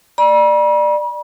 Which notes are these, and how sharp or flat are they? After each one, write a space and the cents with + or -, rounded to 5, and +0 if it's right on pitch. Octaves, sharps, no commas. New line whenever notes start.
D5 +20 B5 -45